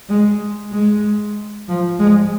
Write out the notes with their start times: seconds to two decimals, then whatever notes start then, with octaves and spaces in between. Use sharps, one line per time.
0.09 G#3
0.72 G#3
1.68 F3
1.99 G#3